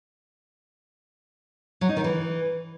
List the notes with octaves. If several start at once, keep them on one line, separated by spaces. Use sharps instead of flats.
F#3
D#4
D#3
E3